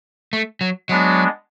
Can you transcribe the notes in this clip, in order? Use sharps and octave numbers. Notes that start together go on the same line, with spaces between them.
A3
F#3
F#3 G#3 B3 D4